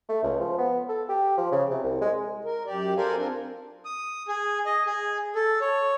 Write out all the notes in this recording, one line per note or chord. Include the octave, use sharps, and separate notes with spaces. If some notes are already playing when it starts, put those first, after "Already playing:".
A3
C#2
F3
B3
A4
G4
F3
C#3
C3
C2
G#3
A#4
F#2 G4 D5
A4 A#4 C5 D5 F5 G#5
C4 D4 F4 A#4
D#6
G#4
D#5
G#4
A4
C#5